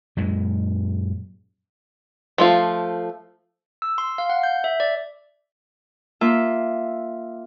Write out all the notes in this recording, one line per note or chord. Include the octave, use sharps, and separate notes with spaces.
F#2 A#2 G#3
F3 A3 F4
E6
C6
F5
F#5
G6
E5
D5
A#3 F4 E5